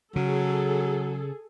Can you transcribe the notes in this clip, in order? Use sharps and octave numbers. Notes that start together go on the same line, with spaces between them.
C#3 F#3 G#4 A4